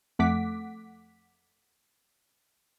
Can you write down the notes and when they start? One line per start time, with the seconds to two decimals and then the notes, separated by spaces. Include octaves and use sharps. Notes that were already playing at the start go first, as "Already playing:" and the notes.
0.19 F2 A3 F#5 D6 B6